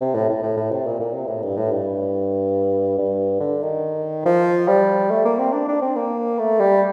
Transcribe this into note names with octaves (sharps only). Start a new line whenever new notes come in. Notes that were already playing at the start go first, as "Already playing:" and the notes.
C3
A2
A2
A2
A2
C3
A#2
A#2
C3
A2
G2
A2
G2
G2
D3
D#3
F3
G3
A3
A#3
C4
D4
D4
C4
A#3
A3
G3